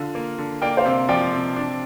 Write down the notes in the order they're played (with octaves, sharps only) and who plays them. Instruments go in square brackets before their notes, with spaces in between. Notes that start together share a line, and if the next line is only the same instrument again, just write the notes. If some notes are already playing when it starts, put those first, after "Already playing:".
Already playing: [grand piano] D3 F4
A#3
D3
[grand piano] A#3 [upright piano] D5 G5
[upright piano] C5 F5
[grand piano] C3
[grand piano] F3 [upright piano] D5 G5
[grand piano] C3
D4